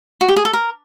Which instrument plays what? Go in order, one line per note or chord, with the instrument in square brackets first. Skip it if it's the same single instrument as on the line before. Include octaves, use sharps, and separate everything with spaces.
[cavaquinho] F#4
G4
G#4
A4
A#4